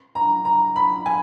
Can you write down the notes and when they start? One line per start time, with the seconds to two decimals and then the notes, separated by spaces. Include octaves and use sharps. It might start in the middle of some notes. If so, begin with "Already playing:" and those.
0.15 A#5
0.45 A#5
0.76 B5
1.06 G#5